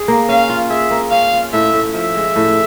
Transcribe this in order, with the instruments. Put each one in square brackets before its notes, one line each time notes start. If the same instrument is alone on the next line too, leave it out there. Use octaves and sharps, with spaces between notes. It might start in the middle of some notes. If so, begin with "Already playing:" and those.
Already playing: [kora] G#4
A#3
[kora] C#4 [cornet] F5
[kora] F4
[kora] G#4 [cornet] E5
[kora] A#3
[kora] C#4 [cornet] F5
[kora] F4
[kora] A2 [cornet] E5
[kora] A2
[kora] F3 [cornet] E5
[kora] G#3
A2